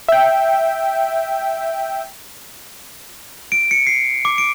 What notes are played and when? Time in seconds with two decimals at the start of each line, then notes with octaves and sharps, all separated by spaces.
0.09 E5 G5
3.52 D7
3.71 C#7
3.87 C7
4.25 D6
4.38 D7